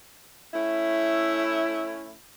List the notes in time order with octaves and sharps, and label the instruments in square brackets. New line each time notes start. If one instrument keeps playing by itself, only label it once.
[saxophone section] A3 C#4 E4